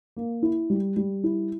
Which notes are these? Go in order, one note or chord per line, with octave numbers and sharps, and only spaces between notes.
A#3
E4
G3
G3
E4